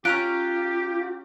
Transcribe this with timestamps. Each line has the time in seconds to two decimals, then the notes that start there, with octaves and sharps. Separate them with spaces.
0.05 C#4 F4 G4 A#5 F#6 D7